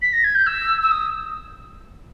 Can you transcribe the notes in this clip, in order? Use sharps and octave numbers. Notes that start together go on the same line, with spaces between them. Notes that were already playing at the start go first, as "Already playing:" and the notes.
B6
A#6
G#6
G6
E6
E6
D#6